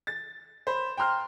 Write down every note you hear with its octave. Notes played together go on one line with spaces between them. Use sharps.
A6
C5 B5
G5 A#5 C6 F6